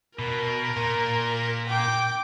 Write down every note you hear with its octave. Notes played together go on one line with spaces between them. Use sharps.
B2 A#4
A#2
G5 D6